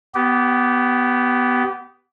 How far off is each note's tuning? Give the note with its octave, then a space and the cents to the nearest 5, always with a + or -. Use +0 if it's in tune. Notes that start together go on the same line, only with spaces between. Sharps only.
B3 +5 G4 -20